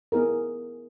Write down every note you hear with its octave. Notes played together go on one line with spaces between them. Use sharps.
B3 E4 G#4 A#4